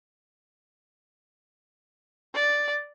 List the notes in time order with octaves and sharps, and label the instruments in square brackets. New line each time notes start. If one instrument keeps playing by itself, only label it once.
[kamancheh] D5